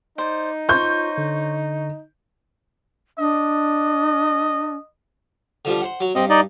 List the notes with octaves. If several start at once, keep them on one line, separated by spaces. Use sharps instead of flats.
D#4 C5 D5
F4 C5 C#5 C#6 G6
D3
D4 D#5
D3 F3 G3
C5 F#5
F#3
G2 C4 D#5
D#4 D5 D#5